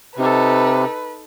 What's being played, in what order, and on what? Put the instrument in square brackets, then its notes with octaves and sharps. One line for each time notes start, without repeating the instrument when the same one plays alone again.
[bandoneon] C3 [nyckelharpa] D#4 A4 [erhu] B4